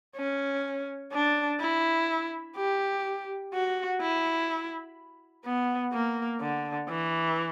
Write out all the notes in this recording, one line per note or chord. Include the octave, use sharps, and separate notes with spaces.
C#4
D4
E4
G4
F#4
E4
B3
A#3
D3
E3